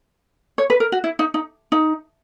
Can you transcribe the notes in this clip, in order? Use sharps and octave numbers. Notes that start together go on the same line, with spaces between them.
C#5
B4
A#4
F#4
E4
D#4
D#4
D#4